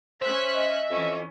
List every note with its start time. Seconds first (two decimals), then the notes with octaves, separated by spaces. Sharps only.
0.22 C#4 C5 E5 F#6 B6
0.54 D#5
0.91 F2 E3 C#4